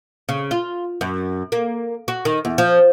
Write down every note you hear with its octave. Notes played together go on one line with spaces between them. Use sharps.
C#3
F4
F#2
A#3
F#4
D#3
E2
F3